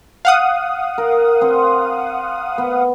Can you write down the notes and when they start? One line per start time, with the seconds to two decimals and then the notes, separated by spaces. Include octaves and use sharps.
0.25 F5 F#5 D#6
0.98 A#4
1.41 C4 C5
2.58 B3